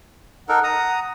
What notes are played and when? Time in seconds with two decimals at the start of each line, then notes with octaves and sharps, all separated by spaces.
0.49 D#4 A4 A#4 F#5
0.64 A#5 D#6